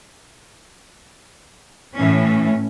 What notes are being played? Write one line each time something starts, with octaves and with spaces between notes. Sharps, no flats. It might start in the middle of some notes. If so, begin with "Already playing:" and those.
A2 E3 C#4